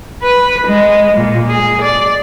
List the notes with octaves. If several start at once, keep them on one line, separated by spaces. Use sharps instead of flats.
B4
G#3
A#2
G#4
D5